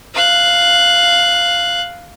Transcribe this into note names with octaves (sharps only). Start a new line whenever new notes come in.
F5 F#6